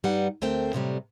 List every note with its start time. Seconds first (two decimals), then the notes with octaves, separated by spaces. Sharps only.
0.04 G2 G3 D#4 B4 F#5
0.42 D2 A3 C4 A#4 C5 G5
0.73 A2 C3 F#3 G3